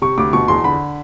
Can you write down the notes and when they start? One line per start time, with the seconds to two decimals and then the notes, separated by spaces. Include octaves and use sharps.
0.02 C3 C#6
0.18 D2 D6
0.33 B2 C#6
0.48 E2 C6
0.64 D3 B5